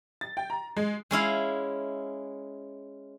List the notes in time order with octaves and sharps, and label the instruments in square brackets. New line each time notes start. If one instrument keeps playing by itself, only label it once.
[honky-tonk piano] A6
G5
A#5
G#3
[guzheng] G#3 C#4 E4 F5